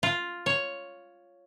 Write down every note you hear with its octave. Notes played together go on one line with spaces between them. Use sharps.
F4
C#5